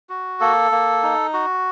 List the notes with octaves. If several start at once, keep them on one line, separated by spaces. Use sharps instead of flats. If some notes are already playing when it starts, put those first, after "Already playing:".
F#4
A#3 A4
A#3
D#4
F#4